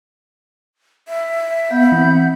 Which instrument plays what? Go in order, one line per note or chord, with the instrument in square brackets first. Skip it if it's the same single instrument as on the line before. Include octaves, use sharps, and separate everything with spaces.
[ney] E5
[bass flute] B3 [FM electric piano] F5 [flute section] F#5 B5 G6
[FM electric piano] E3 [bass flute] C4